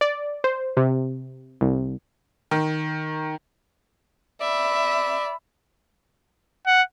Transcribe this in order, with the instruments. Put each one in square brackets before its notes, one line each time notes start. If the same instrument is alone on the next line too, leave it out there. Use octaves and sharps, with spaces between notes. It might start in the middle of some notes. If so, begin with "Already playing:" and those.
[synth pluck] D5
C5
C3
C2
[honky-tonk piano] D#3
[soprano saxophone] D5 [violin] E5 [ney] B5
[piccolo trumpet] F#5